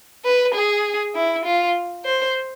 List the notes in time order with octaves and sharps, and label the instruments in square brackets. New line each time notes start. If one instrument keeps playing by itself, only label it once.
[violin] B4
G#4
E4
F4
C5